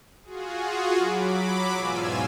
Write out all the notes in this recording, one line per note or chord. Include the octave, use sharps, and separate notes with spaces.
F4 F#4 G#4
F#3 B5 D6
E2 G#2 B2 F4 G#5 E6